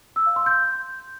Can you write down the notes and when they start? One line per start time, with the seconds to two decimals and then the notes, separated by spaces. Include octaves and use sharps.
0.16 E6
0.26 F5
0.36 C6
0.46 G6